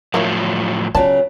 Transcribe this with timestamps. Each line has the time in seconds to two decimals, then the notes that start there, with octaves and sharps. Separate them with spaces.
0.14 A2 F3 F#3 A#3 E4 C#5
0.95 C#3 F#3 B3 F4 D5 A5